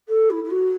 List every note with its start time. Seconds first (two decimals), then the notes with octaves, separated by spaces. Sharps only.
0.08 A4
0.30 E4
0.44 E4
0.50 F#4